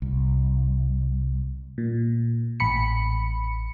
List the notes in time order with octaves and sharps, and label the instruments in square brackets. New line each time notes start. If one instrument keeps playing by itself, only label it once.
[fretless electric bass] C2
[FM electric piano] A#2
A1 B5 C#7